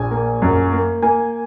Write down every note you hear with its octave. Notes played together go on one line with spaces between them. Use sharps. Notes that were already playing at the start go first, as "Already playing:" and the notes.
Already playing: A#1 G#5
A#3
F#2
A#3
A#3 G#5